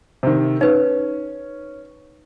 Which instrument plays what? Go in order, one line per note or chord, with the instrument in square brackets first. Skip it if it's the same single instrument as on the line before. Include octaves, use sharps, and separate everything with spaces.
[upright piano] C3 D#3
[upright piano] C#4 [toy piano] D#4 B4